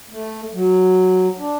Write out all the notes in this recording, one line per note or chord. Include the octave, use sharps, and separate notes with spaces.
A3
F#3
D4